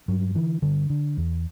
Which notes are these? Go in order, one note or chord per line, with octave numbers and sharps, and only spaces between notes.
G2 F#3
D3 E3
G2 D3
D3
E2